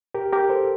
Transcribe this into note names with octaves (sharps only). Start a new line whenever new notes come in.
G4 A#4
G4 A#4
A4 C5